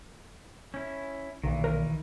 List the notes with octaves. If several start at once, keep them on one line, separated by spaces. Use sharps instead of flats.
C#4 E4
B1 A#2 D#3 E3
A#4